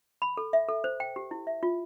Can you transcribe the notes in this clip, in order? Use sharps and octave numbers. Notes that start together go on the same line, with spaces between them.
B5
A4
E5
A4
C5
G5
G4
E4
E5
F4